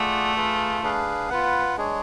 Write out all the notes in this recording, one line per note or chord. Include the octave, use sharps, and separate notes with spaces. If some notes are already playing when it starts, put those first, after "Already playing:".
Already playing: A3 F4 G#4 D5 F#5
F4 G#4 B4 F5
D4 G#4 B4 F5
B3 F4 B4 F#5
G#3 D4 G#4 C#5